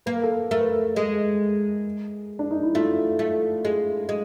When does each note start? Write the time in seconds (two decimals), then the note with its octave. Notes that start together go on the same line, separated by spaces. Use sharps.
0.06 A#3 B4
0.16 A#4
0.23 A4
0.32 A#4
0.51 A3 A#4
0.60 B4
0.68 A#4
0.96 G#3
2.39 D4
2.51 D#4
2.63 E4
2.75 A3 F4
3.19 A3
3.65 G#3
4.09 G#3